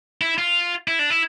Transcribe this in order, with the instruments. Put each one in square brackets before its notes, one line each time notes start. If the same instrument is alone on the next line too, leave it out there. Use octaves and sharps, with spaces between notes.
[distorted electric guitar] E4
F4
E4
D4
E4